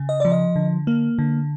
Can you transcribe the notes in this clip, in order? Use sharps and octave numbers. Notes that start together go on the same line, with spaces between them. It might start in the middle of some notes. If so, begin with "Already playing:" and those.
Already playing: C#3
D#5
F3 D5
D#5
D3
A#3
D3